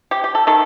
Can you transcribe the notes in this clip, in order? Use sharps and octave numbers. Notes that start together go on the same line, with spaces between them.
G4
G4
A4
D#3 A4